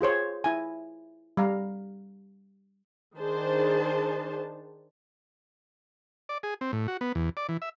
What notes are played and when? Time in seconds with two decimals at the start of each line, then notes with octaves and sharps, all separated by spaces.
0.01 F4 G#4 C5 C#5
0.44 E4 G#5
1.37 G3 F5 A#5
3.18 D#3 D4 G#4 C5 A5
6.29 D5
6.43 G#4
6.61 C4
6.73 A2
6.88 F#4
7.01 B3
7.15 E2
7.37 D5
7.49 E3
7.62 E5